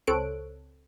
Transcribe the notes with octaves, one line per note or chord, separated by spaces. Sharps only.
C#2 C4 A4 C#5 F#6 D7